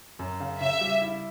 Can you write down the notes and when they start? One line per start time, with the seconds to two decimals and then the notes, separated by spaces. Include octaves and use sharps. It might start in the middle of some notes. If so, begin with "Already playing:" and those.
0.19 F#2
0.40 C#3
0.60 C#3 E5
0.81 G3
1.01 E4